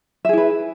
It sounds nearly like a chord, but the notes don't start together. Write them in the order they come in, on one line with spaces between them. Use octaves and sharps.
E5 G#4 E4 B4